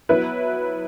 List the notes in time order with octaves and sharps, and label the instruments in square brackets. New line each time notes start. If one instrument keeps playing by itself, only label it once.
[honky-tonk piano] F#3 B3 E4 B4